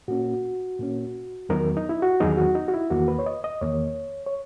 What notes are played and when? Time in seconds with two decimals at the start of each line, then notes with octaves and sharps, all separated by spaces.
0.08 A#2 A#3 C#4 F#4
0.79 A#2 A#3 C#4
1.49 E2 D#3 F#3 B3 D#4 A#4
1.77 D#4
1.89 E4
2.02 F#4
2.20 E2 D#3 F#3 B3 D#4 G#4
2.37 F#4
2.55 D#4
2.68 F#4
2.74 E4
2.90 E2 D#3 A#3 F#4
3.08 B4
3.19 C#5
3.26 D#5
3.44 D#5
3.61 E2 D#3 A#3 C#5
4.26 C#5